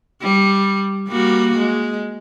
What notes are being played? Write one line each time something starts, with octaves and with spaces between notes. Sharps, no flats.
G3
G3 A#3 F#4
G#3